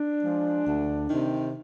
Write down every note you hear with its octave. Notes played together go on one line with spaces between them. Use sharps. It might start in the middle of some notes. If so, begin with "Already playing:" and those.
Already playing: D4
F3 G#3
D2
C3 D#3